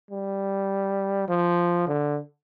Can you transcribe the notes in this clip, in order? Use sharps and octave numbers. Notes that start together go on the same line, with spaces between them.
G3
F3
D3